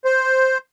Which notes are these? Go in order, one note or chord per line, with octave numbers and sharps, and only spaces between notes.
C5